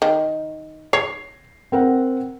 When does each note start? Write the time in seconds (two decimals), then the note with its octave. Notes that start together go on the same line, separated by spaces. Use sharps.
0.02 D#3
0.93 C#5 C7
1.72 C4 A#4 F#5